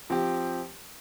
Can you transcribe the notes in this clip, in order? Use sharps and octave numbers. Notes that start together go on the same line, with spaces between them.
F3 C4 G4